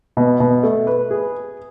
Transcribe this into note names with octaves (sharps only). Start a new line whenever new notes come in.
B2
B2
A3
B4
G#4